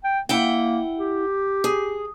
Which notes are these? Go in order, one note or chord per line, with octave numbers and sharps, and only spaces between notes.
G5
A#3 E4 F#5 G5
G4
G#4